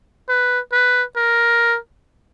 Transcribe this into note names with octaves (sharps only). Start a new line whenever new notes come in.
B4
B4
A#4